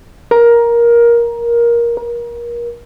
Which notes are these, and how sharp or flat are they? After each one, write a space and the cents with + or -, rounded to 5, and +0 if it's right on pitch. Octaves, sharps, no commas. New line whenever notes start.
A#4 +15
A#4 +30